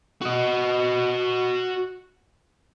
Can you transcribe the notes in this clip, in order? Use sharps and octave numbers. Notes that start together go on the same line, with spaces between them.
F#4 D#5